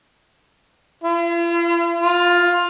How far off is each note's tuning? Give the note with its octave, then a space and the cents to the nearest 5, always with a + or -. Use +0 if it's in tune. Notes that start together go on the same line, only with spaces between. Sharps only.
F4 -45
F4 +10